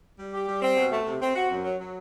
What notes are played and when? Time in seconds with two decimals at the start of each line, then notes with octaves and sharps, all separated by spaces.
0.19 G3
0.34 G4
0.49 G3
0.62 C4
0.77 B2
0.92 A3
1.06 C3
1.21 C4
1.36 F#4
1.50 F#2
1.64 F#3
1.79 F#3